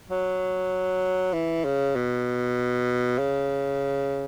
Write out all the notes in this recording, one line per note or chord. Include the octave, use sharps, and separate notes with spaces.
F#3
E3
C#3
B2
C#3